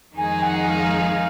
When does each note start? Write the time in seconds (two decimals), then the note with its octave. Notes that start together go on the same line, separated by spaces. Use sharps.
0.17 F2 D#3 G#3 D#4 G#4 G#5
0.42 F#5
0.68 F5